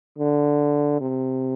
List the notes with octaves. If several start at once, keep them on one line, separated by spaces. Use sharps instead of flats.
D3
C3